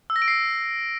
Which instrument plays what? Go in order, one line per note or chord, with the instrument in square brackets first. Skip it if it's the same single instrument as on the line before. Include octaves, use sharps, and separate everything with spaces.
[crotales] E6
A#6
D7
C7